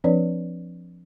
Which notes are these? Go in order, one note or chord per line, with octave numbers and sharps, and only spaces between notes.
F3 C4 D4 B4 C#5 D5